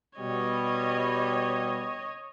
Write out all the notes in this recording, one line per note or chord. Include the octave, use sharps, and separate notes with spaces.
B2 G3 C#5 D#5